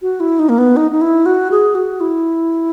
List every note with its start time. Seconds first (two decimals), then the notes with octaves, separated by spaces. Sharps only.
0.02 F#4
0.20 E4
0.39 D#4
0.49 A#3
0.58 B3
0.77 D#4
0.91 D#4
1.01 E4
1.26 F#4
1.51 G#4
1.75 F#4
2.01 E4